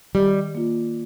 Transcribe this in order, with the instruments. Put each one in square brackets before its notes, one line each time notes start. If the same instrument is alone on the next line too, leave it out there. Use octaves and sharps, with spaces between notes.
[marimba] D#3 [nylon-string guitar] G3
[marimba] A#3 F4